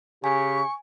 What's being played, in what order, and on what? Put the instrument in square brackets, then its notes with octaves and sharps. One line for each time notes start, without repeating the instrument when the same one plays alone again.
[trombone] C#3 [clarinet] G4 [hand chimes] G#5 [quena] C#6